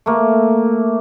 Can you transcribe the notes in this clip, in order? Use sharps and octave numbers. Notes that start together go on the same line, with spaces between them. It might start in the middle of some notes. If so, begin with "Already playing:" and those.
A3 A#3